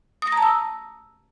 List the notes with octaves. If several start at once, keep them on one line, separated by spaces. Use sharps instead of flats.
D#6
A#6
A#5
A5
E6